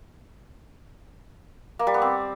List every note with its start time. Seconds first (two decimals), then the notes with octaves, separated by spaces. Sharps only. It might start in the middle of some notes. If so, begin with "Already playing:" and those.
1.79 A#3
1.87 G3
1.94 B3
2.02 C4